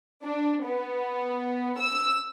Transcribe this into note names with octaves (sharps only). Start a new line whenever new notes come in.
D4
B3
E6